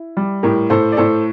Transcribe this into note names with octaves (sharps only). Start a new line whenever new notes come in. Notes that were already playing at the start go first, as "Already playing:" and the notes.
Already playing: E4
G3
A2 G4 A#4
A2 A4 C5
D5
A2 A4 C5